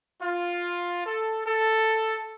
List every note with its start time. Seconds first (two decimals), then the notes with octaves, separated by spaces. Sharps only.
0.22 F4
1.05 A4
1.46 A4